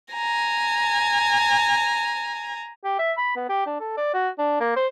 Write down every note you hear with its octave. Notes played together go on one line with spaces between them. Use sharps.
G#5 A#5
G4
E5
B5
B3
G4
D4
A4
D5
F#4
D4
A#3
C5